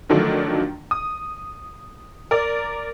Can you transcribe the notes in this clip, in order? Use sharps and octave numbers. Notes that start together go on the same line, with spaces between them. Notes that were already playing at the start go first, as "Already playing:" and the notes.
D3 D#3 F3 F#3 A3 D4
D#6
A#4 D5